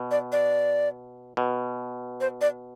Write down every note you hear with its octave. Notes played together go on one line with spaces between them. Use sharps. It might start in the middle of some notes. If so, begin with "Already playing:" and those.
Already playing: B2
D5
D5
B2
C5
D5